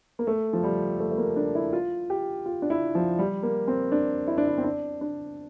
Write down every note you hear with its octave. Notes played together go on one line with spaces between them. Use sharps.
A#3
A3
F3
G3
A3
A3
A#3
D4
E4
F4
G4
F4
D4
E4
F3
G3
A#3
C4
D4
E4
D4
E4
C4
D4
D4